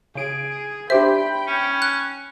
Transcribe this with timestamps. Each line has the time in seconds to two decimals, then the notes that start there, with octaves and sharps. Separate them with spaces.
0.15 C#3 G#4 D7
0.90 D4 G4 C5 E5 G5 B5
1.47 C#4
1.82 F#6